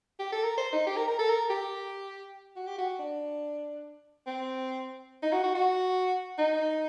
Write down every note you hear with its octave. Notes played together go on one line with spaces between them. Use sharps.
G4
A4
A#4
C5
D#4
G4
A#4
A#4
A4
A#4
G4
F#4
G4
F#4
D4
C4
D#4
F#4
F#4
F#4
D#4